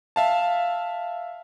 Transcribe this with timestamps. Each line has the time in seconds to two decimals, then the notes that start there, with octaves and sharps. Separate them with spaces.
0.16 E5 F5 A5